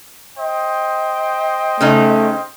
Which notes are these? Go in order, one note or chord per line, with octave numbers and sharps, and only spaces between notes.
C5 D#5 G5
C#3 A3 C#4 D#4